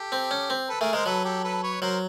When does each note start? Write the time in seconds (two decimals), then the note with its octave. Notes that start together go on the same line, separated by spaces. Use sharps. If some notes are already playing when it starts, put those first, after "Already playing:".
Already playing: G4 A4
0.12 C4
0.31 C#4
0.50 C4
0.69 A4 B4
0.81 A3 G#4 A#4
0.93 G#3 A#4 C5
1.06 F#3 A4 B4
1.25 G4 A4
1.44 A4 B4
1.63 B4 C#5
1.81 F#3 A#4 C5